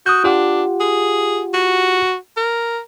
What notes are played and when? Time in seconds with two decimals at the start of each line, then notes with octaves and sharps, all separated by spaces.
0.06 F#4 D#6 F#6 G6
0.24 D4 F4 G4 F#5
0.80 G#4
1.54 F#4
2.37 A#4